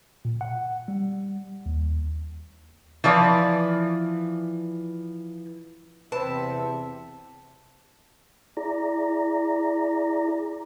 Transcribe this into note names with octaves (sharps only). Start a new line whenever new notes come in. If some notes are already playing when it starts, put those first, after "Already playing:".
A#2
F#5
G3
D#2
E3 F3 D5
E2 C3 C4 B4 C5 E5 A5
E4 G#4 D5 A#5